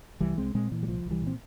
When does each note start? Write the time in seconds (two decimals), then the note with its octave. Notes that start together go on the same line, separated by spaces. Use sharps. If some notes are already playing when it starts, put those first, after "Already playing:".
0.20 C2 E3 G3
0.37 C2 G#3 C4
0.55 A#2 G#3 C4
0.71 A#2 E3
0.83 G3
0.88 C2 F3
1.05 C2
1.11 E3 G3
1.22 A#2 C4